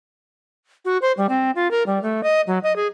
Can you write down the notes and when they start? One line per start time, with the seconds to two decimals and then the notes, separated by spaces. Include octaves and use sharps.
0.85 F#4
1.02 C5
1.17 G3
1.29 C4
1.56 F4
1.71 A#4
1.86 G3
2.03 A3
2.23 D#5
2.47 F#3
2.63 D#5
2.76 G#4